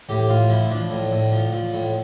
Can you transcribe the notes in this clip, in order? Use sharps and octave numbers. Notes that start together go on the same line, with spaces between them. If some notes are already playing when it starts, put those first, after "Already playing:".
A2 G4
A2 F4
F3 E4
F3 D4
A2
A2
F3
F3
A2